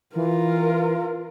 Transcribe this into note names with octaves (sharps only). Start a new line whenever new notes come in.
E3 F4 A#4